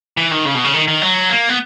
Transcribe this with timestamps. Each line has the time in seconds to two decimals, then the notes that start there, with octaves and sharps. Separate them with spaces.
0.17 E3
0.31 D#3
0.45 C#3
0.55 B2
0.64 C#3
0.73 D#3
0.88 D#3
1.02 F#3
1.29 A#3
1.49 B3